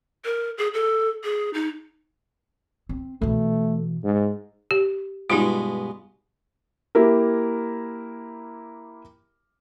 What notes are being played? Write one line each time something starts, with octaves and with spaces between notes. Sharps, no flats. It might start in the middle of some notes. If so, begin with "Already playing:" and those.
A#4
G#4
A4
G#4
D#4
C4
B2 E3 A3
G#2
G4
G2 B2 G#3 D#4 F4
A#3 E4 G4 A#4